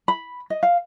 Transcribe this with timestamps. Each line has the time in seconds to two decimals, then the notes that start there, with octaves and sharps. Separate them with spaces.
0.08 B5
0.50 D#5
0.63 F5